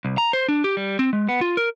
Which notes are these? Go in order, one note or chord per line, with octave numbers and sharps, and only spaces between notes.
C2
A#5
C5
D4
G4
G3
C4
G#3
B3
F4
A#4